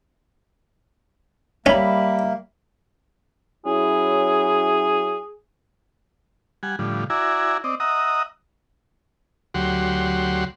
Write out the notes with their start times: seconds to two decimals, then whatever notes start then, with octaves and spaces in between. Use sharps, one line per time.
1.66 G3 A#3 C#4 E5 B5
3.66 F#3 C#4 E4 G#4
6.63 G3 F#5 G#5
6.79 A2 D3 F3 G3
7.10 E4 F#4 D5 E5 G#5 A#5
7.64 C4 D5 D#5
7.80 D#5 E5 F#5 A#5 D#6
9.54 D2 F#3 G4 F#5 C6